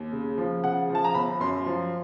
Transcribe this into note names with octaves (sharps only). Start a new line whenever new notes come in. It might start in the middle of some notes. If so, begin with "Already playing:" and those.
Already playing: D#2
C#3
F3
C#3 F#5
F3
A5
A#5
G1 B5
F#2 C6
F3